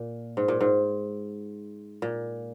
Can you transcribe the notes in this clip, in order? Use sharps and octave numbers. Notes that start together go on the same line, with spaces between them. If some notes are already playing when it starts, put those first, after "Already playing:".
Already playing: A#2
G#2
A#2
G#2
A#2